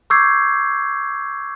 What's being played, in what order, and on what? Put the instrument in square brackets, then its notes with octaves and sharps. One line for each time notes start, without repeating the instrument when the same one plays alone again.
[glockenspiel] C#6 D6 E6 G6 G#6 C7